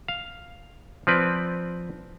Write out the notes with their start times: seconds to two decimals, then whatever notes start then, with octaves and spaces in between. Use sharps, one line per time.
0.08 F5
1.07 F3 C4 B4 D5